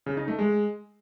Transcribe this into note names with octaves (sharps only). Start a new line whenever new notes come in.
C#3
D#4
A3
G#3